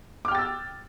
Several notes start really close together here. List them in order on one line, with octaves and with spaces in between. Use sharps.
D6 F6 G5 A6 E6